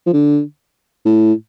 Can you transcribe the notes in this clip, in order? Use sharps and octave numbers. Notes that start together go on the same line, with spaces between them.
F3
D3
A2